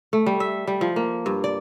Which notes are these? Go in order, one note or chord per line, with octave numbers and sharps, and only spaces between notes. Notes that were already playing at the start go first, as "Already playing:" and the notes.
A3
G3
E5
G3
F3
A#3
G2
D5